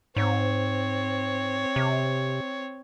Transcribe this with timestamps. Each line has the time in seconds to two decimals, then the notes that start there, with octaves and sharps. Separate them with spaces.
0.16 G#2 C4 C#5
1.76 C3